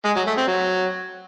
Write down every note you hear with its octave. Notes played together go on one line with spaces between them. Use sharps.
G#3
F#3
A3
C4
F#3